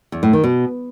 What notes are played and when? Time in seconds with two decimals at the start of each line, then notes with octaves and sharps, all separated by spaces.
0.12 E2
0.23 A2
0.33 D#3
0.44 B2